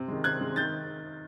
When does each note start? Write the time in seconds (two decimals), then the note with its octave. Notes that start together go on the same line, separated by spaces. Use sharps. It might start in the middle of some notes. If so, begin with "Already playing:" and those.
Already playing: C3
0.08 D#3 G#3
0.24 C3 F#6 G#6
0.40 D#3 G#3
0.56 D#3 G6 A6